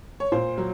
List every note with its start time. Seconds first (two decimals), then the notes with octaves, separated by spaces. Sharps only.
0.20 C#5
0.32 A#2 C5
0.58 F#3